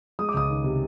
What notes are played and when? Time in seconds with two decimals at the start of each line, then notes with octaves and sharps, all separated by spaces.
0.19 G#3 D#6
0.29 D6
0.34 C#2 D#6
0.49 D#3
0.64 C3